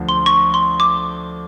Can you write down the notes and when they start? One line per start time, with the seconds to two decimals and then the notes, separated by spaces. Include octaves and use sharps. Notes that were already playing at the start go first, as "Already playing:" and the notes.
Already playing: D2 F3
0.09 C6
0.26 C#6
0.54 C6
0.80 D6